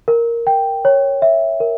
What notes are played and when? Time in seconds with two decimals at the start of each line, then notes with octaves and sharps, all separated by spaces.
0.08 A#4
0.47 G5
0.85 C#5
1.22 E5
1.60 A#4